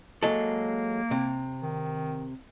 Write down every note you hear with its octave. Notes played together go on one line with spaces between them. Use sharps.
F#3 G#3 A#3 A4
C3
D#3